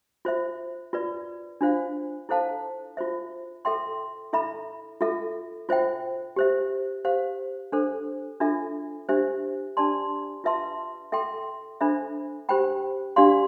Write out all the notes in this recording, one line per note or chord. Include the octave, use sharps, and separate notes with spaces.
F4 C5 E5
F4 B4 D5
D4 F4 C5 F5
E4 A4 C5 F5 A5
F4 C5 E5
A4 E5 G5 C6
E4 A4 E5 B5
F4 A4 E5
F4 C5 E5 G5
G4 C5 E5
G4 C5 F5
D4 A4 C5
D4 F4 A4 E5
D4 G4 C5 E5
D4 G4 D5 A5 C6
F4 B4 E5 A5 C6
A4 E5 G5 C6
D4 A4 C5 E5 B5
G4 C5 G5 B5
D4 G4 D5 F5 C6